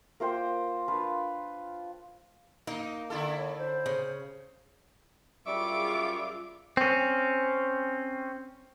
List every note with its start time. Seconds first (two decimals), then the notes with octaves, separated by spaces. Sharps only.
0.20 A#3 F4 C5 G5
0.88 D4 F4 B4 F5
2.67 A#3 D#4
3.10 D3 E4 A4
3.37 C#5
3.58 C5
3.86 C#3
5.46 F#2 A2 G3 F4 G#4 E5 C#6 D6
6.77 C4 C#4